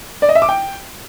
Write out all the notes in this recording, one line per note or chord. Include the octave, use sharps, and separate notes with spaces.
D5
D#5
E5
D6
G5